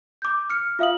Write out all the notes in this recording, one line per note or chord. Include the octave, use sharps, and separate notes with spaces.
D6 G6
F6 C#7
F4 E5 F5 D#6 F#7